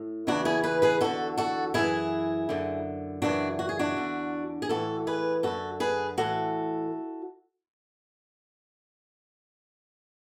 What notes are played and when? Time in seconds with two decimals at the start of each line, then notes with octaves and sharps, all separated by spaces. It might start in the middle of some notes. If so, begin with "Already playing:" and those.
Already playing: A2
0.27 E2 C#3 E3 D4 F#4
0.45 E4 G#4
0.64 G#4 B4
0.82 G#4 B4
1.01 E2 D3 F#4 A4
1.38 F#4 A4
1.74 F#2 E3 E4 G#4
2.49 F#2 D3
3.22 F#2 C#3 E3 D4 F#4
3.59 F#4
3.69 G#4
3.79 D4 F#4
3.97 E2 D3
4.62 G#4
4.69 A2 E3 F#4 A4
5.07 G#4 B4
5.43 F#2 D3 F#4 A4
5.80 G#4 B4
6.18 A2 E3 F#4 A4